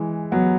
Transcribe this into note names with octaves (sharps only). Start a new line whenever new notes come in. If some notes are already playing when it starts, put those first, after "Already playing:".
Already playing: E3 G#3
F#3 B3